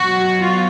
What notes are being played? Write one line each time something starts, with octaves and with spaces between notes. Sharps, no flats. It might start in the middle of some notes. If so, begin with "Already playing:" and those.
Already playing: B2 F#3 F#4
F4